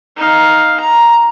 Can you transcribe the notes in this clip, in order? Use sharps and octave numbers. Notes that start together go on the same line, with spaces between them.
D#4 F5
A#5